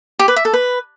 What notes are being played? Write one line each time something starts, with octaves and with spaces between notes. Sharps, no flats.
G4
B4
E5
A4
B4